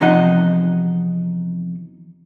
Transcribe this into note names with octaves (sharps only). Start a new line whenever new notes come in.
E2 C3 F3 D#4 D#5 F#5